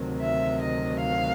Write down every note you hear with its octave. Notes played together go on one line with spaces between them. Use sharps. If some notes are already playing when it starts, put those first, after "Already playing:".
Already playing: D2 C3 D#3 F#3
E5
D#5
F5